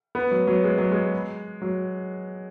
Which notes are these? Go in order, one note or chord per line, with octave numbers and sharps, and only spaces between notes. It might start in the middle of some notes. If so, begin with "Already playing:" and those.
B3
F#3
F#3
G#3
F#3
G#3
F#3